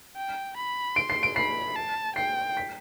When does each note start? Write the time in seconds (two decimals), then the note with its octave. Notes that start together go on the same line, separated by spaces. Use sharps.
0.16 G5
0.56 B5
0.95 C6 D7
1.10 C7
1.23 D7
1.36 B5 C7
1.76 A5
2.16 G5 C7
2.57 B6